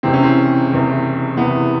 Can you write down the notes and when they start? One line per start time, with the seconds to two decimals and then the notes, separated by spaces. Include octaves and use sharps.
0.03 F#1 E2 C3 E3 C4
0.13 C#4
0.23 C4
0.70 F#1 E2 C3 E3
1.37 F#1 E2 C3 E3 B3